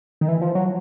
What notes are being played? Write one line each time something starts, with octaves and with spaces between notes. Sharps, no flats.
D#3
E3
F3
F#3